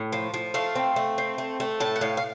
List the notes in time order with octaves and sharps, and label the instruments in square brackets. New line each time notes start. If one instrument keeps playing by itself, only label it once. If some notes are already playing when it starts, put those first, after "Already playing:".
Already playing: [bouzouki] A2
F3
F3
A3 F5
C4
A3
C4
A3
A3
A2 A5
F#5
A2 F5
F5